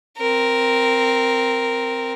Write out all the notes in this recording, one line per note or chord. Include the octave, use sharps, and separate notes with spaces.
C4 A#4